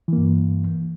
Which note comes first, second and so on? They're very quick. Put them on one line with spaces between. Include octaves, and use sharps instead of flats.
E3 A#3 G2